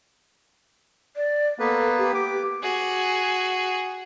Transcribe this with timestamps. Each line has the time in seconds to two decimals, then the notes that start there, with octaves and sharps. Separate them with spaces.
1.16 D5
1.59 A#3 B3 A4 B4
1.98 G4
2.14 D6
2.62 F#4 G#4